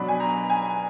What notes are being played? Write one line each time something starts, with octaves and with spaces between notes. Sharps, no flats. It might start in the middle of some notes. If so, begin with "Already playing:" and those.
Already playing: B2 F#3 D4 B5
G#5
A#5
G#5